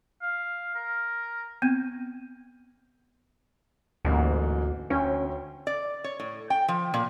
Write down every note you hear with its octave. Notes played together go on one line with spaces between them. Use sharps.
F5
A#4
B3 C4
A1 D2 G#2 A#3
D2 C#4 G5
D5
C#5
A2
G5
F3
A#2